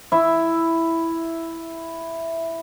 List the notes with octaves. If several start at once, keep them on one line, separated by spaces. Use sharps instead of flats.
E4 E5